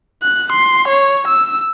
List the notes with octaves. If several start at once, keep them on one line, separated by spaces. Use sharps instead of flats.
F#6
C6
C#5
E6